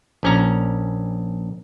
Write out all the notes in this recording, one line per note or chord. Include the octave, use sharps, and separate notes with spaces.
A#1 C#4 A#5